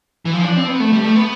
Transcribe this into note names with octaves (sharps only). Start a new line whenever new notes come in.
E3
F3
D4
C4
B3
A3
G3
A3
B3